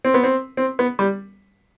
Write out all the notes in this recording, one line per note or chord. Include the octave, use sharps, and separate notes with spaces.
C4
B3
C4
C4
B3
G3